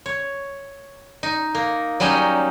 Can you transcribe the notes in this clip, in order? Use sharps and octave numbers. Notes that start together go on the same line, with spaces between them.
C#5
D#4
A#3
F#3 G3 C#4 D#4 D#5